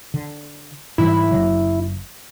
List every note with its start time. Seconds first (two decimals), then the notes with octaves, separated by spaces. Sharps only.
0.14 D3
0.98 G#2 E3 G3 E4
1.31 F#1 D3 F#3